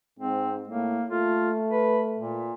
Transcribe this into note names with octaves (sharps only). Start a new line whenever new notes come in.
G#2 C4
A2 A#3
A3 F4
B4
A#2